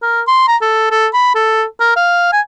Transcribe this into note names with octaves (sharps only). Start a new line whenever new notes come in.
A#4
C6
A#5
A4
A4
B5
A4
A#4
F5
G#5